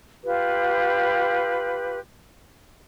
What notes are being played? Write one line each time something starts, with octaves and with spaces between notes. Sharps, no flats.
F4 G4 B4